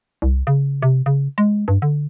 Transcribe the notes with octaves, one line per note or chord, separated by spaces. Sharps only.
C2
C#3
C3
C#3
G#3
G2
D3